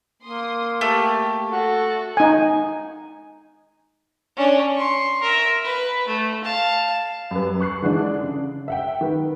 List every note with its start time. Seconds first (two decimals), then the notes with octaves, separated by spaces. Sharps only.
0.22 A#3 C6 D#6
0.81 A3 G4
1.50 F#4 A4
2.17 D#4 G#5
4.37 C#4 D4
4.75 C6 C#6
5.22 A#4 E5
5.64 B4
6.08 A3
6.44 F5 A5
7.31 F#2 G3 B4
7.61 C#6 F#6 C7
7.82 D3 E3 G#3 D4 D#4
8.23 C#3
8.68 E5 F#5 G5
9.01 D#3 B4